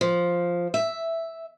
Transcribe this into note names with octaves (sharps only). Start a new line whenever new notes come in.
F3
E5